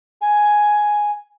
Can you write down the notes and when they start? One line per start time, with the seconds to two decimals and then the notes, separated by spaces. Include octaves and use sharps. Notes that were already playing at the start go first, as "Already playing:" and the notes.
0.21 G#5